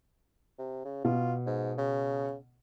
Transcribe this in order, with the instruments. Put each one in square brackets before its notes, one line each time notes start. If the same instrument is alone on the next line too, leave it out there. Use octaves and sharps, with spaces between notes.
[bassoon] C3
C#3
[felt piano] B2 [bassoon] F4
[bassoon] G#2
C#3